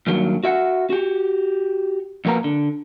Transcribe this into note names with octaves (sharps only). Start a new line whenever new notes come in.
G2 D#3 F#3 A#3
F#4 E5 F#5
F#4 G4
F2 B2 A#3 B3 A#5
D3